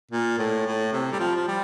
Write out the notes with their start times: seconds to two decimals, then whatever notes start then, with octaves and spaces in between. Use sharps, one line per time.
0.12 A#2
0.39 A2
0.66 A2
0.93 C3
1.12 G3
1.20 F3
1.36 F3
1.48 G3